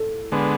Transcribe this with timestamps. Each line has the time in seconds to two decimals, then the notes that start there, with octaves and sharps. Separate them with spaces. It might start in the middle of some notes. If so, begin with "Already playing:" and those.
Already playing: A4
0.32 D3 G#3 B3